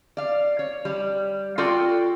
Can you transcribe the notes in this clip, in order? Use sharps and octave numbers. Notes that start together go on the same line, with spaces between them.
D5 F5
C#5
G3
F4 F#4 A4 D5 F5 G5